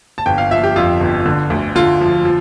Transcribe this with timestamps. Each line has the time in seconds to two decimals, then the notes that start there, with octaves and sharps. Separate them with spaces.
0.18 A5
0.26 G1 G5
0.38 F5
0.51 F3 E5
0.64 G4
0.76 F2 F4
1.00 G1
1.26 D3
1.50 D2
1.75 D3 F4
2.01 F3
2.25 F3